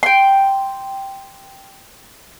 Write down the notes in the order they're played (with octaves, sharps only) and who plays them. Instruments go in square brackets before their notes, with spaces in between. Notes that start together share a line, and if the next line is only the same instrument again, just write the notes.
[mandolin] G5 C6